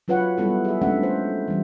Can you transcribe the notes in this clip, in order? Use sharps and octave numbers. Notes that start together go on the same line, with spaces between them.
F#3 F4 B4 C#5 F#5
G3 B3 E4 A4
G#4 E5
G#3 A3 C#4 D4 E5 F#5
G#3 C5
E3 G3